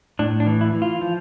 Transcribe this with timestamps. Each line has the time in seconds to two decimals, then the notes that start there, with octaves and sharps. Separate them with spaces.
0.19 A2 D4
0.40 D4
0.47 E3
0.61 E4
0.75 E3
0.82 F4
1.02 F3